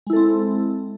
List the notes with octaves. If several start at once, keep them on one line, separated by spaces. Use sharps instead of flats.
G#3 C4 E4 A4